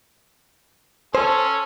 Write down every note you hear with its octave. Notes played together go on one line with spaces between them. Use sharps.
C#4 A4 C5